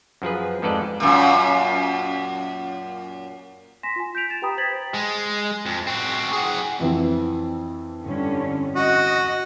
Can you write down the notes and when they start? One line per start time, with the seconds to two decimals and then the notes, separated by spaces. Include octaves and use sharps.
0.22 F#2 F3 G#4 B4
0.62 F2 G#2 A4 B4 D5 D#5
1.00 F#2 A#2
3.83 G#5 C6 A#6 B6 E7
3.96 F4 G#5
4.15 G6 B6 D7 F7
4.30 A6 E7
4.42 G4 B4 G5 A#5 B5 D#6
4.58 C5 G#6 A6 B6 F#7
4.94 G#3
5.66 F2
5.87 C4 F#4
6.33 G#4 F#5
6.79 F2 E3 C4
8.04 G2 D3 C#4
8.75 F#4 D#5